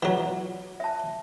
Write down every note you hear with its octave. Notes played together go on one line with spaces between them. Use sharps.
E3 F#3 F4 F#5
E5 A5